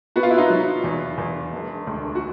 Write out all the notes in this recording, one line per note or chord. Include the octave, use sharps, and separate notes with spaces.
B3 F#4
F4
E4
D#4 F4
F#3
E2
E2
E1
D2
F#4